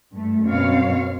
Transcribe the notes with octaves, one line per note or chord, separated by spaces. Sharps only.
G2 A3
F#2 B2 C4 C#5 F5